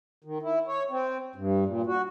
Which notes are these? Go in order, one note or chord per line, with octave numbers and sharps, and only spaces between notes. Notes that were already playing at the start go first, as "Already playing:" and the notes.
D#3
E4
C#5
C4
G2
A#2
F#4